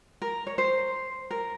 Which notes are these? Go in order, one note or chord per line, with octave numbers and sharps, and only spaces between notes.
A#4
C#5
C5
A#4